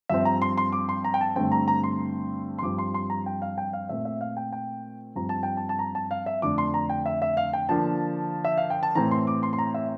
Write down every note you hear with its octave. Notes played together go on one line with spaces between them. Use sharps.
G2 F3 C4 E5
A#5
C6
C6
D6
C6
A#5
G5
A5
G2 D3 A3 C4 G5
A#5
A#5
C6
C6
G2 F3 C4 D6
C6
C6
A#5
G5
F5
G5
F5
A#2 A3 C4 E5
E5
F5
G5
G5
G2 F3 C4 A#5
A5
G5
A5
A5
A#5
A5
F5
E5
F2 D3 A3 D4 D6
C6
A#5
G5
E5
E5
F5
G5
D3 F3 A#3 D4 A5
E5
F5
G5
A5
A2 E3 A3 C4 A#5
C6
D6
C6
C6
A#5
E5